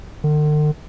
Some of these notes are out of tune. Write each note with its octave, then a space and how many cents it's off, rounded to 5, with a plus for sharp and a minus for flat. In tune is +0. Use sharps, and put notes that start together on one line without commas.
D3 +45